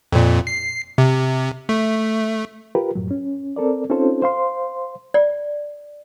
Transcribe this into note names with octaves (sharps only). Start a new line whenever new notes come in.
F2 A#2
C7
C3
A3
F4 G4 A#4 B4
F#2 A2 F#3
C#4
C4 A4 A#4 D5
C4 C#4 D#4 F4 A4 C5
C5 F5 C6
D5